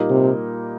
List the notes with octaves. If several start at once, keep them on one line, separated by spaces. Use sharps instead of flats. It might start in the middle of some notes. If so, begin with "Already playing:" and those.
Already playing: A#2 G3 A#3 D#4
C3